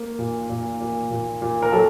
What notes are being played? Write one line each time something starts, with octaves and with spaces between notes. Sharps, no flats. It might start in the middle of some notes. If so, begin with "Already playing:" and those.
Already playing: A#3
A#2
A#2
A#2
A#2
A#2
A#4
F#3 A4